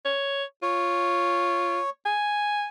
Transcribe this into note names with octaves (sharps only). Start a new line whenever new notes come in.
C#5
F4 C#5
G#5